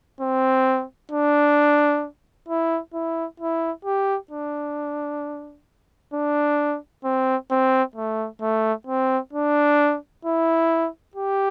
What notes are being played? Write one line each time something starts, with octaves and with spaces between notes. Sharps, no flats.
C4
D4
E4
E4
E4
G4
D4
D4
C4
C4
A3
A3
C4
D4
E4
G4